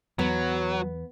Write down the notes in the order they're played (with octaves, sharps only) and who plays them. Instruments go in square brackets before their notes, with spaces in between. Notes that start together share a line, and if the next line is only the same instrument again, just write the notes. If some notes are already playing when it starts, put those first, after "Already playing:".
[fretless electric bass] E2 [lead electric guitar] F#3 [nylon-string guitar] B3